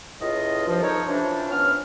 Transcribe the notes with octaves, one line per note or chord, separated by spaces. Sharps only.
C#2 A2 F4 D#5
G2 F3
C4 D#4 A4 A#4 C5 C#5
C3 E3 F3 C#4 D4
B3 C#4 F6